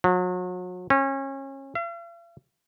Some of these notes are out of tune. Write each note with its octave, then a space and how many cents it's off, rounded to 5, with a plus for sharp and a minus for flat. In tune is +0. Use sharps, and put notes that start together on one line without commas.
F#3 -35
C#4 -30
F5 -45